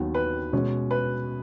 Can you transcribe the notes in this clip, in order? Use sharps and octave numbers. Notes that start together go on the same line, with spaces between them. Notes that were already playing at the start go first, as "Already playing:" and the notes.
Already playing: D#2 D#3 F#3 B3
B4
B2 G#3 C#4
B4